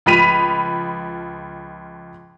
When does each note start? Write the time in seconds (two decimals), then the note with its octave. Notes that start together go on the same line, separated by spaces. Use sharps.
0.06 C#2 F3 B5 B6 D#7 F7